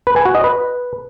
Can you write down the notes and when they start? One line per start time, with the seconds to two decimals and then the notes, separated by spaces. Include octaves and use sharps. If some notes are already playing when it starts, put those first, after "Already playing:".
0.07 B4
0.16 G#5
0.25 F#4
0.35 D#5
0.44 B4